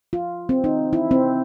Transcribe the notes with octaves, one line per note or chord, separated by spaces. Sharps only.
F4
C4
D#4
E4
C4